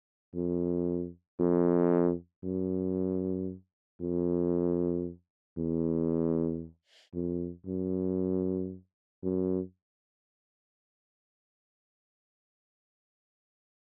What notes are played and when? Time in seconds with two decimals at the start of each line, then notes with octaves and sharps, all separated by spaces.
0.35 F2
1.40 F2
2.44 F#2
4.01 F2
5.58 E2
7.14 F2
7.66 F#2
9.23 F#2